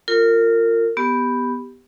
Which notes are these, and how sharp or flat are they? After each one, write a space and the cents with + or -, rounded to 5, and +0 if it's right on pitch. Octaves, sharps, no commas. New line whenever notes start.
F4 +0 A#4 -30
B3 +0 G4 +0